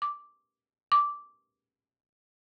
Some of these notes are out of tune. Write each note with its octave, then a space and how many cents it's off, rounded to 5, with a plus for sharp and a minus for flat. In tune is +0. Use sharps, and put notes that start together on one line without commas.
D6 -5
D6 -10